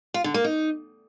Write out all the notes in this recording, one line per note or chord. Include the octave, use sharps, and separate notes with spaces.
F4
D3
A#3
D#4